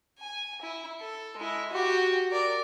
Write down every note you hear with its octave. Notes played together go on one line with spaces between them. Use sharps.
G#5
E4
A4
G#3 E4
F#4 G4
A#4 D5